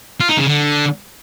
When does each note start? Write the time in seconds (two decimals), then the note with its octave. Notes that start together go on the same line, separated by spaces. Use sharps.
0.20 F4
0.29 D#4
0.38 C#3
0.47 D3